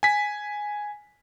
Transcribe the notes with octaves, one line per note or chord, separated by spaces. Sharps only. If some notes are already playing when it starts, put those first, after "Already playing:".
G#5 B6